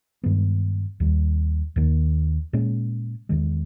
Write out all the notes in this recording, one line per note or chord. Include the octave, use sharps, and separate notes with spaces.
G2 D#3 G#3 B3
D#2 D#3 G3
D#2 D#3 A#3
A#2 G#3 C#4
E2 D#3 G#3